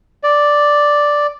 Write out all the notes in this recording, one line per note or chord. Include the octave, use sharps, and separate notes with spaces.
D5